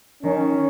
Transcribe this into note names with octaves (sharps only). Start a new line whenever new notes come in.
D#3 C#4